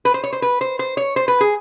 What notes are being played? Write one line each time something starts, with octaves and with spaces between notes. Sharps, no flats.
B4
C5
C#5
C5
B4
C5
C5
C#5
C5
B4
G#4